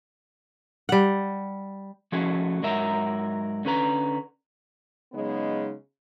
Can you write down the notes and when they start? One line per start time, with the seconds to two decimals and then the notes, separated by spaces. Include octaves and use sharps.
0.89 G3 F#5
2.12 F3 A3 C#4 F#4 G#4
2.62 G#2 F#3 A#4 E5 A#5
3.65 D3 C#4 B4 A#5
5.13 C#3 F#3 G#3 B3 D#4